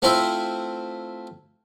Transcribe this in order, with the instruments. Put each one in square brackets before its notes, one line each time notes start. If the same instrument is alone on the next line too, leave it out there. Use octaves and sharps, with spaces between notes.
[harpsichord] A3 C4 E4 F4 C5 E5